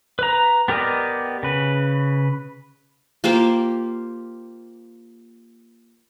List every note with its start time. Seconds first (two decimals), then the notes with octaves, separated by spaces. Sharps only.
0.19 B4 A#5
0.68 B3 G4 A#4 D5 D#5
1.43 C#3 B4
3.24 A#3 F4 G4 C5